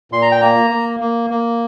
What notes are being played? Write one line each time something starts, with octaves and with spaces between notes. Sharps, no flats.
A#2 C6
A#5
G5
A#3 A#5
A#3
A#3
A#3